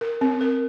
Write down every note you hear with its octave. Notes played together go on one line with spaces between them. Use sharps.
A#4
C4
A#4